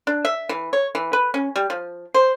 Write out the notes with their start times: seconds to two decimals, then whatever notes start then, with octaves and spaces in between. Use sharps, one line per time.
0.07 D4
0.25 E5
0.49 E3
0.73 C#5
0.95 E3
1.13 B4
1.34 C#4
1.56 G3
1.70 F3
2.14 C5